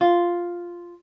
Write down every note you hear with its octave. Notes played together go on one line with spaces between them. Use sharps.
F4